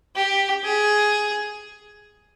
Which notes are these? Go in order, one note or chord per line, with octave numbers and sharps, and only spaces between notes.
G4
G#4